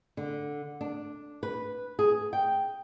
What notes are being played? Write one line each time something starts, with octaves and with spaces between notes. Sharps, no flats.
D3
D4
B4
G#4
G5